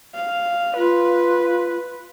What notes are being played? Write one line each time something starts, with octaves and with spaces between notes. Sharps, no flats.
F5
F4 B4